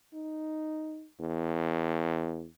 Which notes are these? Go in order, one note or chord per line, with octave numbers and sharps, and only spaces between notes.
D#4
E2